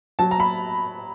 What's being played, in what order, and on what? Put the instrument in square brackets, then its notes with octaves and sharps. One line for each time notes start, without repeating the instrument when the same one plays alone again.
[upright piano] F#3 A5
A#5
B5